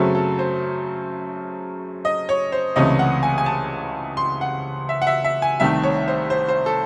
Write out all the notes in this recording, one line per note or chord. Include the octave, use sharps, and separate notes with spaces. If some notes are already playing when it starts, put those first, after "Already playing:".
Already playing: F#2 C#3 F#3 A3 C4 A4
A4
C5
D#5
C#5
C5
C#2 C3 E3 A3 C#4 D#5
F#5
G#5
G#5
A5
C6
F#5
E5
F#5
E5
E5
G#5
C2 C3 D#3 A3 E5
C#5
C5
C5
C5
A4